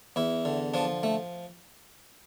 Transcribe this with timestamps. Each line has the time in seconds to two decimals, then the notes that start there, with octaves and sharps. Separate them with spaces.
0.16 E2 E4
0.45 D3
0.74 F3 D4
1.03 A3